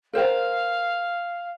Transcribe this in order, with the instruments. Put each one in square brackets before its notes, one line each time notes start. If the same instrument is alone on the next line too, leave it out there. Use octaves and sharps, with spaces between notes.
[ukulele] A#4 C5 G5 [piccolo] F5